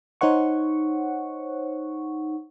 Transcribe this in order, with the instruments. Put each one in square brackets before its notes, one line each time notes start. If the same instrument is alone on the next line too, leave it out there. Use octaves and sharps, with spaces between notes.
[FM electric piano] D#4 C5 C#5 F#5 C#6